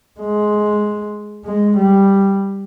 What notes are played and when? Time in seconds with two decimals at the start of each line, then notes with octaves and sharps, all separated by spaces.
0.20 G#3
1.45 G#3
1.77 G3